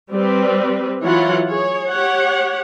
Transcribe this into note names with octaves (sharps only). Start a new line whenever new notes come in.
G3 C4 B4
E3 F#3 F4 C#5 F#5
G#4 C#5
G4 C#5 F#5